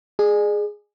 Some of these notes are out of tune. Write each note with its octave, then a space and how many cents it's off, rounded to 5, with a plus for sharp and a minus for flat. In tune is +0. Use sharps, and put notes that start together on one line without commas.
G#4 +0 D5 +45